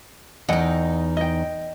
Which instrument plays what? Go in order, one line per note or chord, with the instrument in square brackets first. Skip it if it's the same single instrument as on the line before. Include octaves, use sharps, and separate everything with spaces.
[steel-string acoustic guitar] E2 D#4 [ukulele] D#5 F#5 G5
[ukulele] D#5 G5